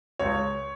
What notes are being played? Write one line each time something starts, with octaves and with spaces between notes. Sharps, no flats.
C#2 C#5